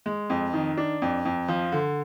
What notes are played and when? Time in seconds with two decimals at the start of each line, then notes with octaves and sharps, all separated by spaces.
0.06 G#3
0.30 F2
0.53 D#3
0.77 D4
1.02 F2
1.25 F2
1.48 F3
1.72 D3